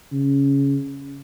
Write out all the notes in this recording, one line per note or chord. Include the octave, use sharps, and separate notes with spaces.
C#3